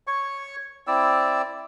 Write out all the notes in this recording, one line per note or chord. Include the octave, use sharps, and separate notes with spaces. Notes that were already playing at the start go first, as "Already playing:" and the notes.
C#5 C#6
C4 E4 D5 E6